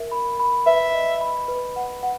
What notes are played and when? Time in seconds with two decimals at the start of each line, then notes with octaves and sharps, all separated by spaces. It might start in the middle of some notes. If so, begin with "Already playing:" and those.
Already playing: A#4 E5
0.11 B5
0.40 B5
0.66 B4 E5
0.94 D#5
1.21 B5
1.48 B4
1.76 F#5
2.03 F#5